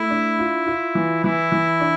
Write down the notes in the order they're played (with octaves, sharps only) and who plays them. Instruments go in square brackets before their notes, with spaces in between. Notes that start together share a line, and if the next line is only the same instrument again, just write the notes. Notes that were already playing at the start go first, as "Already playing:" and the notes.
Already playing: [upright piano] A3 [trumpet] E4
[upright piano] D4
F4
F4
E3
[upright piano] E3 [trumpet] E4
[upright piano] E3
D4